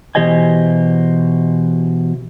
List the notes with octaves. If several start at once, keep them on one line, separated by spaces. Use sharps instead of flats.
B2 E3 G4 C5 D#5 G#5